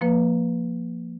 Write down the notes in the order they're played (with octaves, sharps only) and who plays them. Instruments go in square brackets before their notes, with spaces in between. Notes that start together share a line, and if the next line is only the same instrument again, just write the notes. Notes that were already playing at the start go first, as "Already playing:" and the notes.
[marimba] F3 A#3 B4